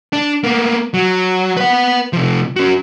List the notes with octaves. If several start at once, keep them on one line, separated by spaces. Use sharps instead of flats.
D4
A#3 B3
F#3
B4 F#5
C3 F3
C#4 F#4